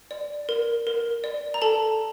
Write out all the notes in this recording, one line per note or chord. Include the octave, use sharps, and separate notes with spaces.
D5
A#4
A#4
D5
A#5
A4 A5